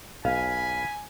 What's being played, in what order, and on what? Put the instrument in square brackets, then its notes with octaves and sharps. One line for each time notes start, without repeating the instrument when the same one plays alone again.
[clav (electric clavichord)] B1 [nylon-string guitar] F5 [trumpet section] G#5 [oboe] B5